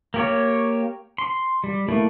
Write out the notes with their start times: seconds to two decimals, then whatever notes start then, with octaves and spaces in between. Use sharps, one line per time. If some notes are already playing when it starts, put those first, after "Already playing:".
0.14 A#3 G4 C#5
1.18 C6
1.64 G3
1.88 A3 A#3 E4